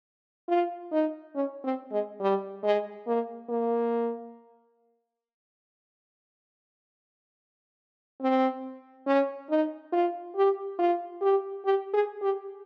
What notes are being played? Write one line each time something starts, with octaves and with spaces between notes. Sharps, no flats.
F4
D#4
C#4
C4
G#3
G3
G#3
A#3
A#3
C4
C#4
D#4
F4
G4
F4
G4
G4
G#4
G4